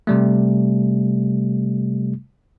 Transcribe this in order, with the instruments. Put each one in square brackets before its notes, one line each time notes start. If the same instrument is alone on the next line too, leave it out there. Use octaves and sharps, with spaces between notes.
[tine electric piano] C3 G3 A3